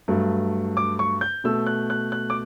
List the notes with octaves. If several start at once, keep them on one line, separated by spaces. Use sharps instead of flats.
G2 F#3 A3
D6
C#6
G6
B2 A3 E6
F#6
F#6
F#6
D6